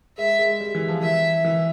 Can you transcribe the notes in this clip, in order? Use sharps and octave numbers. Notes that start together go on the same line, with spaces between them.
G#3 E5
G#3
G3
E3
F3
E3 E5
E3